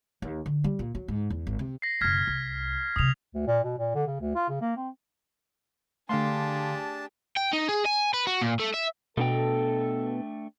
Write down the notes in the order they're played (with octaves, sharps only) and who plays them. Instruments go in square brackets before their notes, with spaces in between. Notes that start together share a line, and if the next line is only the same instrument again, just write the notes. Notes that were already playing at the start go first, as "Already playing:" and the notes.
[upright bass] D#2
D3
G3
A#2
F#3
G#2
E2
G#1
C3
[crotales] A#6 C7
[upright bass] F#1 B2 [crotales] F6 G#6 B6
[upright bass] C2
[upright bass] F#2 C3 [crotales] D#6 F7
[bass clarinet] D2
A#2
B2
A#2
D3
C#3
D2
F4
C#3
A#3
C4
[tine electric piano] D3 F5 C6 [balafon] A3 [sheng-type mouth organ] D4 A5 [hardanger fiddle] G4 G#4
[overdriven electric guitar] G5
D#4
G#4
G#5
B4
F#4
A#2
A3
E5
[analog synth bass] B2 [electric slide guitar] A3 D4 G5 [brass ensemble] A4